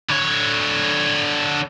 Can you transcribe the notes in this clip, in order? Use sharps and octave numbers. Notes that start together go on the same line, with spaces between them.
D3 C#5